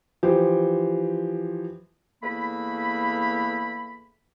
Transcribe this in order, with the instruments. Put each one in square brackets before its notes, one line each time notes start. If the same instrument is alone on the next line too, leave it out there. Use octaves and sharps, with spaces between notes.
[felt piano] E3 F3 G4 C5
[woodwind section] E2 A3 A#3 B5